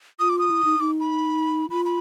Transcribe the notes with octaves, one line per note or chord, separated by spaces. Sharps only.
F4 D#6
D6
D#6
E4
D#4
D#4 D6
B5
F4 B5
B5